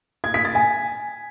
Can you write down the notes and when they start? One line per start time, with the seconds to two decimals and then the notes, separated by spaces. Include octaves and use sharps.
0.24 G#6
0.34 B6
0.45 A6
0.55 G#5